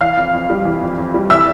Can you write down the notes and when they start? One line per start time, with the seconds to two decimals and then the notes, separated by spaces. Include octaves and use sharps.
0.01 E3 F5 F6
0.17 F2
0.33 F2
0.50 G3
0.65 E3
0.82 F2
0.98 F2
1.14 G3
1.30 E3 E5 E6